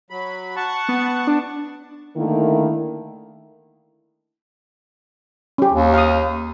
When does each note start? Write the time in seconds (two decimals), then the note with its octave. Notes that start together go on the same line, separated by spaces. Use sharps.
0.10 F#3 B5
0.56 F#5 A5 C#6
0.89 B3
1.27 D4
2.17 D3 D#3 A3 A#3 E4
5.58 C#4 G4
5.72 D#2
5.94 F5 D#6